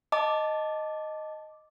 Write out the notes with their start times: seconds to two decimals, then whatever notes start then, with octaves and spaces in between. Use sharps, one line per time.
0.12 D#5 A5 D6